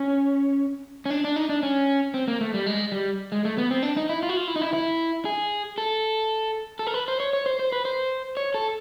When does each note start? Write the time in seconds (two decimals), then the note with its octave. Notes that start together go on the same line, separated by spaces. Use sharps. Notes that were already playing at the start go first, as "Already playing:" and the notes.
Already playing: C#4
1.05 C#4
1.10 D4
1.24 D4
1.36 D#4
1.49 D4
1.63 C#4
2.14 C4
2.28 A#3
2.41 A3
2.54 G3
2.66 G#3
2.92 G3
3.32 G#3
3.45 A3
3.58 B3
3.71 C4
3.83 D4
3.97 D#4
4.09 E4
4.23 F4
4.29 F#4
4.37 F4
4.48 E4
4.56 D#4
4.62 E4
4.73 E4
5.25 G#4
5.78 A4
6.79 A4
6.87 A#4
6.94 B4
7.08 C5
7.20 C#5
7.33 C#5
7.46 C5
7.59 C5
7.72 B4
7.85 C5
8.37 C#5
8.54 A4